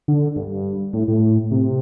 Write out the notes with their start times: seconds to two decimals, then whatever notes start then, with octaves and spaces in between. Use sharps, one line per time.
0.08 D3
0.36 G2
0.93 A2
1.08 A2
1.51 C3